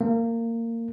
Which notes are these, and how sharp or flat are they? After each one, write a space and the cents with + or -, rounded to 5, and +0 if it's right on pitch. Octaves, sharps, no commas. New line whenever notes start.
A#3 -20